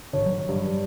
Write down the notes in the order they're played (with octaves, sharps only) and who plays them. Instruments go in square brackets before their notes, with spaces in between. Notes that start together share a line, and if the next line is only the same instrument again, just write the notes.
[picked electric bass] G#1 D3 [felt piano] C#5
[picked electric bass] F#3
[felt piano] G2